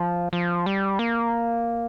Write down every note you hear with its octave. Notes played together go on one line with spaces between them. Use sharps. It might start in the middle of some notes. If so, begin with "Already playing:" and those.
Already playing: F3
F3
G3
A#3